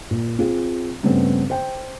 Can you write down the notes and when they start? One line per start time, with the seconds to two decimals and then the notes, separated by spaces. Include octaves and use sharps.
0.11 A#2
0.38 C4 F4 G#4
1.03 G2 C#3 A3 B3 C4
1.50 C5 G5